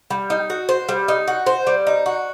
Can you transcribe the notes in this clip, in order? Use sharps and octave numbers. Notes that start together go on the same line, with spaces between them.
G3
D#4
F#4
C5
G3
D#4
F#4
C5
G3
D#4
F#4